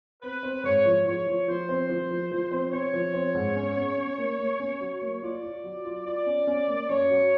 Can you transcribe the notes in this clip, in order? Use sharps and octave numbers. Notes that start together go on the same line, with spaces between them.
C4 B4
C4
G#2 C#5
F3
F3 C#5
F3
F3 C5
C4
F3
F3
F3
C4
C4 C#5
F3
C4
G#2
C#4
C#4
C#4
A#3
A#3
C#4
F#3
A#3
F4 D5
F4
F#3
F4
F4 D5
C#4
C#4
A#3
F#2 C#5
F#3